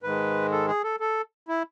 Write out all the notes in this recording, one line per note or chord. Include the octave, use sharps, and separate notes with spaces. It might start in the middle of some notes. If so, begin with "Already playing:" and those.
G#2 D#3 G#3 B4
A4
G#4
A4
A4
E4